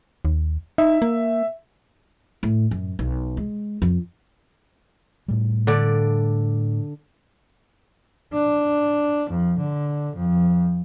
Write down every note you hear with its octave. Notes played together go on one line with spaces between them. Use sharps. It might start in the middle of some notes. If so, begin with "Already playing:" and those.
D#2
D#4 E5
A#3
A2
F#2
B1
G#3
F2
A2 G3
D3 D5
D4
F2
D3
F2